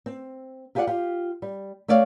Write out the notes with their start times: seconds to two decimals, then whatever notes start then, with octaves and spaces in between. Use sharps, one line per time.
0.06 C4
0.75 F4 G4 G#4 B4 D5 F#5
0.87 F4 G4
1.42 G3
1.88 A3 C#5 D5 F5